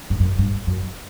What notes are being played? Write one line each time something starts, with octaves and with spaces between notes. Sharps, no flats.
G2
F#2
G2
F#2